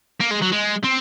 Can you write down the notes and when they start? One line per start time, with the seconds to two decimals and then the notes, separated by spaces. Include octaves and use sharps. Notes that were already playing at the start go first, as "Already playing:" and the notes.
0.20 A#3
0.30 G#3
0.41 F#3
0.52 G#3
0.83 C4